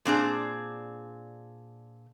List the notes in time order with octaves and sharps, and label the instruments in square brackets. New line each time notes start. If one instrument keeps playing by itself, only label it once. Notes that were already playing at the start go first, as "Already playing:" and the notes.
[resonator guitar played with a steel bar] A#2 C4 D4 G#4